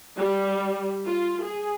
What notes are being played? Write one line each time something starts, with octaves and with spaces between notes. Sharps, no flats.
G3
F4
G#4